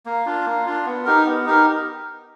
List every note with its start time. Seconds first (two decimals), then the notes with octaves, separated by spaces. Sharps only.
0.06 A#3
0.26 D4 F4
0.46 A#3
0.66 D4 F4
0.86 B3
1.05 D#4 G4 A#4
1.26 B3
1.46 D#4 G4 A#4